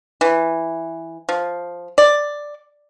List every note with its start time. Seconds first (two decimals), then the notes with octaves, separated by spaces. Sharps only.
0.21 E3
1.29 F3
1.98 D5